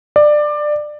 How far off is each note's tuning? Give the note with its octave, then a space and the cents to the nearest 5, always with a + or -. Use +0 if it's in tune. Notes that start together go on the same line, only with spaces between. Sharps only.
D5 +20